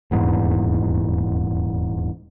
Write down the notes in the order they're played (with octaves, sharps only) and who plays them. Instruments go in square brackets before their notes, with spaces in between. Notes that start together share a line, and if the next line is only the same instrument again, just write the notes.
[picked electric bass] D#1 E2 G#2